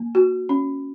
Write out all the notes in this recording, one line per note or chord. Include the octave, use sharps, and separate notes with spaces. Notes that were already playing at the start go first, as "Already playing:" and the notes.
Already playing: A#3
F#4
C#4